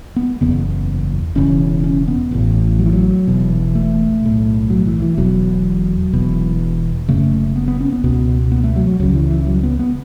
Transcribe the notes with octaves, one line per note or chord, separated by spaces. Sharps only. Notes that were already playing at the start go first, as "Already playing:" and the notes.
B3
F#1 E2 C#3 B3
E1 E2 C#3 C#4
C#4
B3
A1 A2
F#3
E3
F#3
E1 E2 B2
A3
B1 A2
F#3
E3
E3
E1 E2 B2 F#3
E1 E2 B2
F#1 F#2 C#3 A3
B3
B3
C#4
B3
C#2 B2 B3
B3
A3
F#3
F#3
C#2 C#3 F#3
E3
E3
F#3
B3
B3